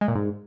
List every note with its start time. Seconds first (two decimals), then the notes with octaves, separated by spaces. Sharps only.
0.01 G#3
0.08 A#2
0.15 G#2